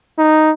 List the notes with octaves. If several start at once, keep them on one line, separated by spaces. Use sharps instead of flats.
D#4